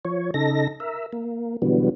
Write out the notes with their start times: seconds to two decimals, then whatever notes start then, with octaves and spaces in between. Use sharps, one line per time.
0.05 F3 C#5
0.34 C#3 D#4 A4 A#6
0.80 A#4 E5
1.13 A#3
1.62 B2 D3 E3 F#3 G3 B3